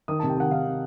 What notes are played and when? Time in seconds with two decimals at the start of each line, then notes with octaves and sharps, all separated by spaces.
0.08 D#3 D#6
0.19 A5
0.23 C3
0.30 G5
0.38 D#3 F#5
0.51 D#3 F5
0.66 C3